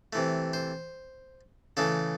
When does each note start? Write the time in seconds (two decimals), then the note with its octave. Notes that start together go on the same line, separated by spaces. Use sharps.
0.13 C3 E3 A3
0.53 C5
1.77 C#3 E3 A3 A4